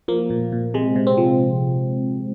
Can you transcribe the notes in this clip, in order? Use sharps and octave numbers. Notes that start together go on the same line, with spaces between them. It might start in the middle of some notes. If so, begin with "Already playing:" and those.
F3 A#3
A#2
A#2
C3 G#3
C3
C4
F3